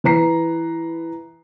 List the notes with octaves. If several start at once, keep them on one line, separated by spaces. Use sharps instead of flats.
E3 B4 A#5 C7